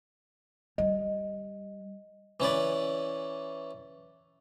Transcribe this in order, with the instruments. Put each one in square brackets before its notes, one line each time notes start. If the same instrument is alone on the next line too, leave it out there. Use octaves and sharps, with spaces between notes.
[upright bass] G3 [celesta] D#5
[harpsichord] E3 C#4 B4 D5